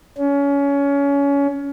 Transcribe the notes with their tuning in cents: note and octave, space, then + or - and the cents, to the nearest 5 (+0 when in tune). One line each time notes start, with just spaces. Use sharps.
C#4 +25